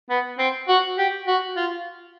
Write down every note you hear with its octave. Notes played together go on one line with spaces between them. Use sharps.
B3
C4
F#4
G4
F#4
F4